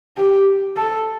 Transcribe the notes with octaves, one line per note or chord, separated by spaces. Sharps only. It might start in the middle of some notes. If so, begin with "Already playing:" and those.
G4
A4